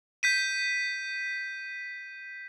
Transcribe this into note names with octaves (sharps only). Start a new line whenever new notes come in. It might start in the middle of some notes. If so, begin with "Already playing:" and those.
G6 B6 D#7